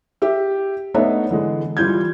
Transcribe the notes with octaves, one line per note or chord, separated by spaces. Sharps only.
G4 E5
A3 B3 D4 D#4 C#5 E5
D3 E3 G#3
E3 G3 F4 G6 G#6